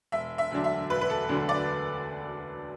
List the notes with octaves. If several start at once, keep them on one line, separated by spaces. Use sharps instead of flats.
E1 E5
E5
D2 D3 F#3 D4
E5
E1 B4
B4
A4
D2 D3 F#3 D4
D5